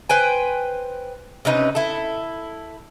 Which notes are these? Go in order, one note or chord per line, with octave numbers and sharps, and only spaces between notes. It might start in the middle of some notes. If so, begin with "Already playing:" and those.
B4 C5 G5 G#5
C3 C#4 D#4 B4
E4 A4